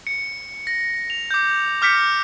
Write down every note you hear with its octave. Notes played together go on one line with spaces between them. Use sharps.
C#7
A#6
F7
D6 G6
D6 F6 G6 B6 C#7